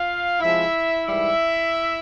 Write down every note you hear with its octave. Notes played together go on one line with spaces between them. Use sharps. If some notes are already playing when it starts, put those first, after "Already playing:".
Already playing: F4 F5
C3 F3 G#3 E4 E5
G#2 E3 G3 E4 E5